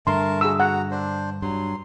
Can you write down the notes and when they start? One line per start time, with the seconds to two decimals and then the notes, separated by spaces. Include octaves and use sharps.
0.07 G2 D3 A3 A#4 A5 C6
0.41 F#4 G#4 A4 E6
0.60 F#4 F#5 A#5
0.91 D4 C5
1.42 G2 F#3 C6